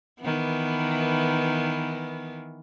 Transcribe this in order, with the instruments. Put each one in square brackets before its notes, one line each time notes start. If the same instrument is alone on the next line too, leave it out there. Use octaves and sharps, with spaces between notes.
[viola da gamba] D#3 E3 B3